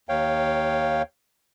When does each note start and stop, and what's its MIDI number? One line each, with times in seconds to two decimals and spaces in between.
0.09 1.02 39
0.09 1.02 73
0.09 1.02 77
0.09 1.02 79